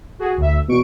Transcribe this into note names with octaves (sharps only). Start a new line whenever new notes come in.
F#4 G#4
D2 E5
E2 B2 C#6 D7